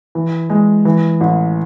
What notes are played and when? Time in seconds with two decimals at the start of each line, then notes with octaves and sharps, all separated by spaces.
0.15 E3
0.50 G#3
0.85 E3
1.21 A1